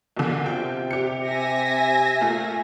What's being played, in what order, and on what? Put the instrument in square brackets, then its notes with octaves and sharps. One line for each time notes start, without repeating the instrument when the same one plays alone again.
[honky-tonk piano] B1 A#2 D3
[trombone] C3 [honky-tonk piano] F4 G5
[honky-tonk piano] G4 C#7
[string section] E5 G#5 A#6
[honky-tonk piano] A#2 A3 F4